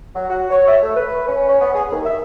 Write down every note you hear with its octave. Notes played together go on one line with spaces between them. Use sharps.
F#3
F#4
C#5
E5
A3
B4
C#4
C#4
B3
G#4
D#2
E5